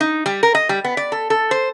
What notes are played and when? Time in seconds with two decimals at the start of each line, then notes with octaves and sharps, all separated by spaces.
0.01 D#4
0.26 G3
0.43 A#4
0.55 D#5
0.69 G3
0.84 B3
0.97 D5
1.12 A4
1.30 A4
1.51 C5